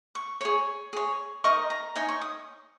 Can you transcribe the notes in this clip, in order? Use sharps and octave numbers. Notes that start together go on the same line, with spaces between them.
C#6
G#4 C#5 C#6
G#4 C#5
D#4 A#4 D#5 C#6
A#5
D#4 C#5 G#5
C#6
D#6